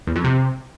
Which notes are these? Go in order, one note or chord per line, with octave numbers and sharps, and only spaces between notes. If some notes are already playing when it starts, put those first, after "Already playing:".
E2
F2
C3